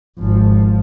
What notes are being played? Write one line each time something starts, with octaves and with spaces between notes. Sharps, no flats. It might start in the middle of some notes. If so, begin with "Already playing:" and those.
G#1 F3